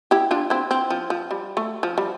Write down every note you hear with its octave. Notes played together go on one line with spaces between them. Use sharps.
E4 G4
D4 F4
C4 E4
C4
F3
F3
G3
A3
F3
G3